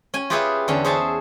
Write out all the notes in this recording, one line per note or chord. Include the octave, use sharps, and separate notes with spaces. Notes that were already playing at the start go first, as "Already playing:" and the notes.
C#4 G#5
F4 G4 G#4 B4 C#5 E5
E2 D3 C#4
G#4 C5 C#5 E5 A5